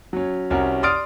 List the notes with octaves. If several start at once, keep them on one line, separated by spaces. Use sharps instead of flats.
F#3 C#4
C2 C#4 F#4 A#4
D5 C6 D#6 F6 A6 D7